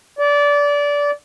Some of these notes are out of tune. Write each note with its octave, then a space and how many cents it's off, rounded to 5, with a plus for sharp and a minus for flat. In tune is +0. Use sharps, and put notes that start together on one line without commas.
D5 -20